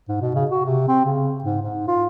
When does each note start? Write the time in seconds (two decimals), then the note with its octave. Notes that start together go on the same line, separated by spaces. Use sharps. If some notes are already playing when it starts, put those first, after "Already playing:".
0.08 G#2
0.21 B2
0.35 C#3
0.51 F#4
0.65 C3
0.88 C4
1.05 C#3
1.44 G#2
1.62 G#2
1.88 F4